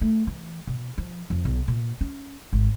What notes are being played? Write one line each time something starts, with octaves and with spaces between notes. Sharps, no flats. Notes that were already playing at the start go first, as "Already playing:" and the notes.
A3
E3
B2
F3
F2
B1
A#2
C#4
G#1